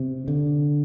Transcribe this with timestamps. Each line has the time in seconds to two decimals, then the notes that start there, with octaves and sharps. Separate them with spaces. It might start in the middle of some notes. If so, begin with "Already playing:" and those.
Already playing: C3
0.28 D3